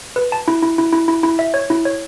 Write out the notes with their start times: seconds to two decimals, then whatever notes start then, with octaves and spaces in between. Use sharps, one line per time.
0.16 B4
0.32 A5
0.48 E4
0.62 E4
0.78 E4
0.92 E4
1.08 E4
1.23 E4
1.39 E5
1.54 C#5
1.70 E4
1.85 C#5